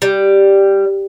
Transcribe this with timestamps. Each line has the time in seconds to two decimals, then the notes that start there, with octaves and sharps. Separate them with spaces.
0.02 G3